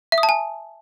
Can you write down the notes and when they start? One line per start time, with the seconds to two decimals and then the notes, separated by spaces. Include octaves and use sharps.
0.12 E5
0.18 D#6
0.23 A5
0.29 G#5